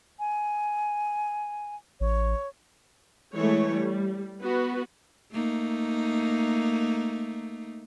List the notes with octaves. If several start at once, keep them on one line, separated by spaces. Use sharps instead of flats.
G#5
A1 C#5
E3 G#3 A3 C#5
G3
B3 F#4 B4
A3 A#3 D#4